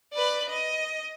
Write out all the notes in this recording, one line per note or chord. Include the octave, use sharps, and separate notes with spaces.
B4 D5
D#5